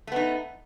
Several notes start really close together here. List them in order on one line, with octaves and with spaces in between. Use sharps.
A3 B3 D#4